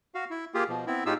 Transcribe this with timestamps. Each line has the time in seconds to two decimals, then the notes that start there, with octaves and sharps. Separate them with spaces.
0.15 F#4 F5
0.30 E4
0.54 A#3 F4 G4 G#4
0.69 B2 F3
0.87 B3 C4 E4
1.06 A2 D#4 F4 G4 G#4 E6